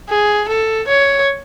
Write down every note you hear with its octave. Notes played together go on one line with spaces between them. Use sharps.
G#4
A4
C#5